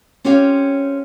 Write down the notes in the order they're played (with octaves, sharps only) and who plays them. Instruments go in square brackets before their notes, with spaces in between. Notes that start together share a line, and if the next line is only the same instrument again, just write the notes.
[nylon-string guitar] C4 C#4 F4 G4 C#5 F5